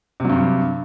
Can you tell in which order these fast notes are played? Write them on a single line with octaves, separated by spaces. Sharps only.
C3 F#3 G2